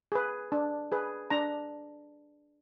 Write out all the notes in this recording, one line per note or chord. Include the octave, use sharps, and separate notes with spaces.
G#4 B4
D4
G#4 B4
D4 A#5